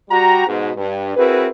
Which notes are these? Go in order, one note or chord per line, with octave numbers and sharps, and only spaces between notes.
G3 F#4 G5 A#5
G#2 B2
G2
C4 E4 F#4 G#4 A#4 B4